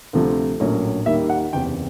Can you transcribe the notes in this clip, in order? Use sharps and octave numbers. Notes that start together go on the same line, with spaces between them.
D2 C3 F3 A3
A#1 A2 F#3 A#3 C#4
D#2 D#3 G3 A#3 E5
F#5
F#1 E2 C3 G5